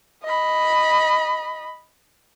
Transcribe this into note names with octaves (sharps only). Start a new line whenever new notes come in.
D#5 B5